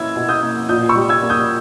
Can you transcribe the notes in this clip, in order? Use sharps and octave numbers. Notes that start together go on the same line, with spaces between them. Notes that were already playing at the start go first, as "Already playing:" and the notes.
Already playing: B2 A#3 C#4 E4 E6 G#6
B2
D#6 G6
A#3
A#2 D#6 G6
C#6 E6
G3
E6 G#6
A#3
D#6 G6